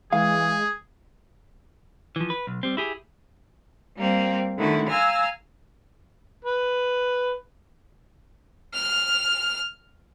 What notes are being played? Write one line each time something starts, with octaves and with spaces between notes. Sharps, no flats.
E3 G#3 G#4 F5
E3 F3
B4
B1
G3 C4
E4 G4 G#4
G3 A#3 C4
D3 D#3 A3 E4 F#4
F5 G#5 A#5 E6 F6
B4
F6